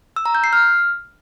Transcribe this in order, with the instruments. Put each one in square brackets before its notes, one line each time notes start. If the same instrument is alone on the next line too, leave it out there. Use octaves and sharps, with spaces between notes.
[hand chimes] E6
A#5
G6
C7
F6